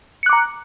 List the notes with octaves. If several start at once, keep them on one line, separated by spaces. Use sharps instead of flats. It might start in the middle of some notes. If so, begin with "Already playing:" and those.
A#5 D6 F#6 C#7